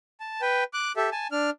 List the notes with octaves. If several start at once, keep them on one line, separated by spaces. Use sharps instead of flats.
A5
B4 G5
D6 F#6
G4 A4 E5
G#5 A5
D4 F6